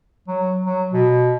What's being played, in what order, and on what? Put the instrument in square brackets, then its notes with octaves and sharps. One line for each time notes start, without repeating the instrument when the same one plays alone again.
[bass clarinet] F#3
F#3
B2